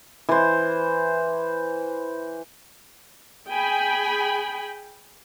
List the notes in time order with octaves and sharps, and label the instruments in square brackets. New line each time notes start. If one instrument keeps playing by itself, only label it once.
[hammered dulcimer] E3 C5
[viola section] G#4 G5 G#5 B5